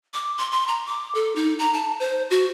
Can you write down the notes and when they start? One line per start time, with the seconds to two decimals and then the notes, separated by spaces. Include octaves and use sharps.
0.14 D6
0.38 C6
0.52 C6
0.68 A#5
0.86 D6
1.15 A4
1.36 D#4
1.59 A#5
1.74 A5
2.00 C5
2.30 F#4